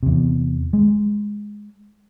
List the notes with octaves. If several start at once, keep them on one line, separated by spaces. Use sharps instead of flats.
E2 C3
G#3